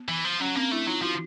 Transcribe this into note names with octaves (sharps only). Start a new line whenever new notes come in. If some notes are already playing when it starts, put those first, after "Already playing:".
Already playing: B3
E3
F3
F#3 C#4
A#3 C4 D4
A3 D4 E4
F#3 D#4 F4
F3 E4 F#4